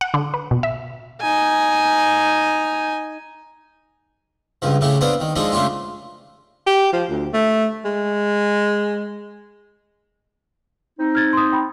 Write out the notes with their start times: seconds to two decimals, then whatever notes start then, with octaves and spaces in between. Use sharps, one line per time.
0.01 F#5
0.14 D3
0.34 B4
0.51 B2
0.63 E5
1.21 D#4 G#5
4.62 C#2 G2 F3
4.81 A2 C#3 A3 E4 G4
5.01 B3 C4 D4 D5 F5
5.20 D#3
5.36 F3 G#3 D4 D#4 A4
5.52 C#3 A3 D4 F4 G4
6.67 G4
6.93 F3
7.10 D2
7.33 A3
7.85 G#3
10.99 C4 D#4
11.15 F6 G#6 A6
11.33 C6 D#6
11.52 G5 B5